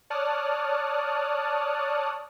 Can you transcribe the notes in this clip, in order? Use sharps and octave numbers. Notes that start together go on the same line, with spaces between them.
C#5 D5 A5 D#6 F6 F#6